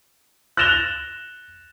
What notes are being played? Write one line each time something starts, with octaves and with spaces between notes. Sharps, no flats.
F#6 A6 A#6 E7 F7 G7